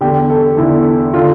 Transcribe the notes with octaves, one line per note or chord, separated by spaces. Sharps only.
E2 D3 G4
A4
E2 D3 E4
D3 F4